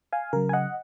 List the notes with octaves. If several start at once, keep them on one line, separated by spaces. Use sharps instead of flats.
F5 G#5
C#3 F#3 A#4
G#5
D#5 F#5